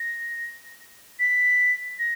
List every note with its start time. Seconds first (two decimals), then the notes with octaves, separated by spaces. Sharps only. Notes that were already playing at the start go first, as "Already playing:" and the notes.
Already playing: A#6
1.20 B6
1.99 A#6